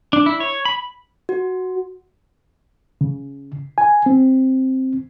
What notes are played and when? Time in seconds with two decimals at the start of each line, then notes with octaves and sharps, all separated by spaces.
0.13 D4
0.26 E4
0.40 C#5
0.65 B5
1.29 F#4
3.01 C#3
3.78 G#5
4.06 C4